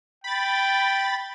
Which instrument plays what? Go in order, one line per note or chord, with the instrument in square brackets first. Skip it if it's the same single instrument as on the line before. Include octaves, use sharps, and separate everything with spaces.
[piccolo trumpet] G5 [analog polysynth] B5 A6